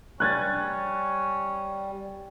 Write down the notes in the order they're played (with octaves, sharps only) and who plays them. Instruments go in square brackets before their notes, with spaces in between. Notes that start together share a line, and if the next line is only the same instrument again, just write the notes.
[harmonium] G3 [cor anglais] C#4 [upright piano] F#6 G#6 A6